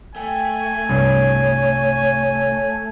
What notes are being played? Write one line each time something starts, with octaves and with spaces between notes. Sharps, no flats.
A3 G5 G#5
C2 G2 C#5